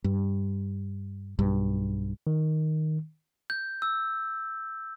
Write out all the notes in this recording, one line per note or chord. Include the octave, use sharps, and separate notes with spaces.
G2
B1 G2
D#3
G6
E6